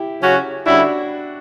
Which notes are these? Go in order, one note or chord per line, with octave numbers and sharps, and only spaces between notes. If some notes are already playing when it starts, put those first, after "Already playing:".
Already playing: E4 G4
C#3 F#3 C#4 F#4
D3 G3 C#4 D4 E4 F#4